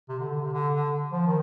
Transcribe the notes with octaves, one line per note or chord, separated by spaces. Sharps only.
C3
D3
D3
C3
D3
D3
F3
D#3